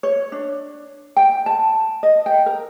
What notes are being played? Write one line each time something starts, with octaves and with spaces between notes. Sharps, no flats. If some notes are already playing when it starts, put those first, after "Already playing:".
C#5
D4
G5
A5
D#5
G5
A#4